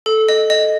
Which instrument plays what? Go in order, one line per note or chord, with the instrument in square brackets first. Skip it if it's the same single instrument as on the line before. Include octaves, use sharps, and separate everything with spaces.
[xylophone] A4
D#5
D#5